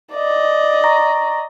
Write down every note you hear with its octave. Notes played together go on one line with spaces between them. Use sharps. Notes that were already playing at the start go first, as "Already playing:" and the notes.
D5 D#5
A#5 C#6 A#6